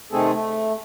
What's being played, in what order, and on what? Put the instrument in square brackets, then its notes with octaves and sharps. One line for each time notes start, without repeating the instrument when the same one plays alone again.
[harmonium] C3 D#3 A3 C4 G#4 A4
A3